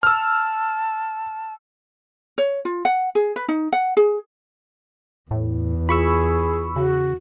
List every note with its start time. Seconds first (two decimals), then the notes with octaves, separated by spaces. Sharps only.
0.03 A5 E6 F6
2.38 C#5
2.65 F4
2.85 F#5
3.15 G#4
3.36 B4
3.48 D#4
3.72 F#5
3.97 G#4
5.31 E2 A2
5.89 F4 G#4 B5 C#6 E6
6.76 C#3 F#4